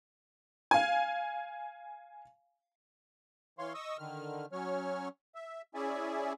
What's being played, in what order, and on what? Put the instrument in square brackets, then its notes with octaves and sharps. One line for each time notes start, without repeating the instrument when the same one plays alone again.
[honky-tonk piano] F5 G#5
[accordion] E3 C#5 F5 C6
D#5 C#6 D#6 E6
D3 D#3 F6
F#3 C#4 C#5 F6
E5
C#4 E4 G#4 D5 E5 G#5